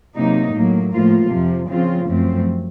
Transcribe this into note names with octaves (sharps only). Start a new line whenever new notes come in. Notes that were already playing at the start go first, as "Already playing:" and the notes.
C3 F#3 A#3 D#4
A2 F#3 A#3
A2 F3 A#3 F4
F2 C3 F3
C#3 F3 C4 F4
F#2 F3 A3 C4